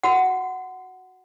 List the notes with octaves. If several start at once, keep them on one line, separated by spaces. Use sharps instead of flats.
F#4 F#5